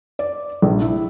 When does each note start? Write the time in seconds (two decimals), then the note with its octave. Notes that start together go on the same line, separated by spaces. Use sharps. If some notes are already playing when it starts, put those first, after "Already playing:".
0.19 D5
0.62 A#1
0.81 E4